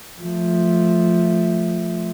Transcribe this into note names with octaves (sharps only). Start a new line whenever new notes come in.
F3 A3